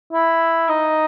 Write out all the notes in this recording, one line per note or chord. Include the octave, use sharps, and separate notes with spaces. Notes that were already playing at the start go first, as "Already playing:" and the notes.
E4
D#4